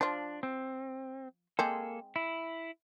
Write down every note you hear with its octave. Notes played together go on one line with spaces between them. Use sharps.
F3 D4 F4
C4
G#3 A#3 C4 G#4 A4
E4